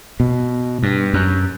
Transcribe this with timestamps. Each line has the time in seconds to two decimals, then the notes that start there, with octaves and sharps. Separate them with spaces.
0.20 B2
0.83 G2
1.14 F#2